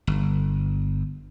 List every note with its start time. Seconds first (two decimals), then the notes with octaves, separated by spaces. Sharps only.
0.07 G1